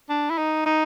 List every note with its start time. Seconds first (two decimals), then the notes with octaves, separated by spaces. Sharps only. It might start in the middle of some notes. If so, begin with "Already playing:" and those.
0.10 D4
0.30 E4
0.38 D#4
0.66 D#4